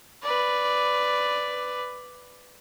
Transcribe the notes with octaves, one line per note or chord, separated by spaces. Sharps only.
B4 D5